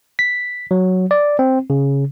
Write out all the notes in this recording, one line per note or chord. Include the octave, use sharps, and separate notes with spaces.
B6
F#3
D5
C4
C#3